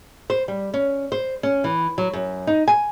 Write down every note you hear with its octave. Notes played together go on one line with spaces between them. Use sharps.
C5
G3
C#4
C5
C#4
E3
F#3
F#2
D#4
G#5